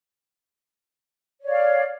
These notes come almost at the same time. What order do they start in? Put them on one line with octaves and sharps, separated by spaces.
C#5 D5 F5